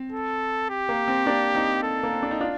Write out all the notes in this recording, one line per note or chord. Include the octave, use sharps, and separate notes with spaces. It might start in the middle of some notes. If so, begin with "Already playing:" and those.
Already playing: C4
A4
G4
A#3
C4
A#3 D4
C4 D#4
A4
A#3
C4
D4
D#4
D4 F4